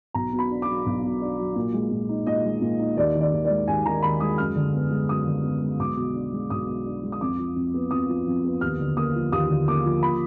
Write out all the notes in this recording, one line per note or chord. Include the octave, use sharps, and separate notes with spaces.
B1 A#5
B2
B5
D4
D6
F#3
B1
B2
D4
F#3
A#2
G#3
A#2
D#4
A#2 D#5
G#3
A#2
D#4
D#2 D5
D#3
D5
D#2
D5
G#3
D#2 G#5
D#3 A#5
D#2 B5
G#3 D#6
F#2 F6
D3
B3
G#3
F#2 D#6
D3
B3
G#3
B1 D6
B2
D4
G#3
B1 D#6
B2
D4
G#3
D#6
F2 D6
F3
F2
B3
F2 D#6
F3
F2
B3
D#2 F6
D3
A#3 D#6
F3
D#2 D#6
D3
A#3 D6
F3
B5